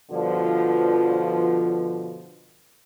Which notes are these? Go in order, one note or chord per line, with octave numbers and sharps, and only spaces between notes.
G2 B2 D3 F3